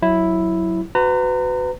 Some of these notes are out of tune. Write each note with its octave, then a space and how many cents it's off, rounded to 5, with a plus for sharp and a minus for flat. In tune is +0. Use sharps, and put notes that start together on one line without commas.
F#3 +0 E4 +0
F#4 +0 B4 +25 A#5 -30